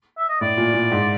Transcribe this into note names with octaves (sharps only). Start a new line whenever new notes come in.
E5
D#5
A2 D5
A#2
A#2
G#2